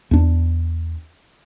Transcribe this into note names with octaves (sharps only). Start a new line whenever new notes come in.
E2 D4